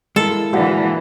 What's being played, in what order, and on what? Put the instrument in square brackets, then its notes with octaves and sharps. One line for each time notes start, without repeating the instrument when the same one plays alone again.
[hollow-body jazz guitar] G#3 A#3 E4 [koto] A4
[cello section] A#2 D3 E3 [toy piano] F#4 F5 F#5